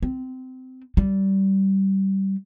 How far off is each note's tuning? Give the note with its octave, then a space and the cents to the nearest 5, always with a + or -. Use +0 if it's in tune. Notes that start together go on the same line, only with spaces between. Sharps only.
C4 -25
G3 -20